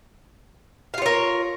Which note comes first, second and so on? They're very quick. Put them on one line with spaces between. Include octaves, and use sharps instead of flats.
F5 F4 C#5 A#4